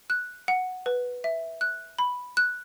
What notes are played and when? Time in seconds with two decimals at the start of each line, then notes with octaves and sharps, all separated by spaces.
0.10 F#6
0.48 F#5
0.86 B4
1.24 E5
1.61 F#6
1.99 B5
2.37 F#6